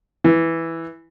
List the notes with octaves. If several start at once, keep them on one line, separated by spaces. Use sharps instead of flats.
E3